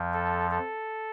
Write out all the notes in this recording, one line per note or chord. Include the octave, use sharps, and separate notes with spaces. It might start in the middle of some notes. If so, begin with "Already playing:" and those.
Already playing: F2 F3
A4
A4